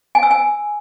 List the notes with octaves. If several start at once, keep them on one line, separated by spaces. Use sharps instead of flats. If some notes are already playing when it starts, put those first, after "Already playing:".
G#5
E6
G#5